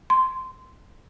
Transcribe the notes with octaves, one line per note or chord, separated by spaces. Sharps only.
C6